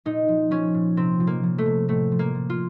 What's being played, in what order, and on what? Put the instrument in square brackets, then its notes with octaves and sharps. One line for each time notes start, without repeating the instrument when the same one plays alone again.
[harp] A#2 D#4
F3
F3 C#4
A#2
C3 C4
F3
A#3
F3
A3
C3
A2 A3
F3
A#3
F3
F4